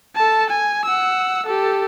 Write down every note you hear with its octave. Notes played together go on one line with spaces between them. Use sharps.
A4 A5
G#5
F#5 E6
G4 A4